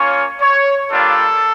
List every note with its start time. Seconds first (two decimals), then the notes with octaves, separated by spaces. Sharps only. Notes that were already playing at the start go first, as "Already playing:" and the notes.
Already playing: A#3 C#4 F4 C#5
0.41 C#5
0.91 G3 A#3 D4 F4 A4